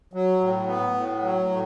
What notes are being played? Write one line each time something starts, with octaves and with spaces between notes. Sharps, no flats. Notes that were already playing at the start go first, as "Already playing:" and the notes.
F#3
A2
B3
A2
F#3
A2